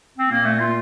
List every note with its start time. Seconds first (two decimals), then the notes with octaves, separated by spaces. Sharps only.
0.18 C4
0.30 A#2 A#3
0.45 A3
0.60 F4